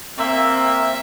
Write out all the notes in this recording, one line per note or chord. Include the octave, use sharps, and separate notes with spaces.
A#3 C4 E5
E5